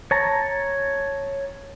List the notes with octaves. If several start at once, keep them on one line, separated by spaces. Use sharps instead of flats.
C#5 A5 A#5